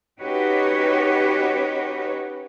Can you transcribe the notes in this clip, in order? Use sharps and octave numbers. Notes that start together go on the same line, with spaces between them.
C#4 D#4 F#4 G4 B4 C#5